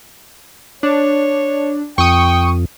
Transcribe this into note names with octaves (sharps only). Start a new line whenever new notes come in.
D4 C#5
F2 G5 C#6 D#6